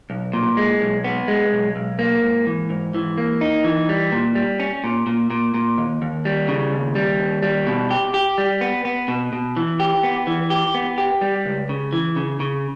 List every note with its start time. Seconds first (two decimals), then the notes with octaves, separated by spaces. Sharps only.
0.10 B1
0.33 A#2
0.57 G#3
0.81 B1
1.04 B3
1.28 G#3
1.52 B1
1.76 B1
1.99 A#3
2.22 G#2
2.47 E3
2.70 G#2
2.95 E3
3.18 A#3
3.41 D#4
3.64 E3
3.89 G3
4.12 A#2
4.35 G3
4.60 C#4
4.84 A#2
5.07 A#2
5.30 A#2
5.54 A#2
5.78 D#2
6.02 D#2
6.25 G3
6.48 C#3
6.72 D#2
6.95 G3
7.20 D#2
7.43 G3
7.67 B2
7.91 G4
8.14 G4
8.38 G3
8.61 B3
8.85 B3
9.08 B2
9.33 B2
9.57 E3
9.80 G4
10.03 B3
10.27 E3
10.50 G4
10.74 B3
10.98 G4
11.21 G3
11.46 C#2
11.69 C#3
11.93 E3
12.16 C#3
12.40 C#3